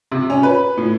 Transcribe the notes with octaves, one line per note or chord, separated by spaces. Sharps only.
C3
C#4
B4
A2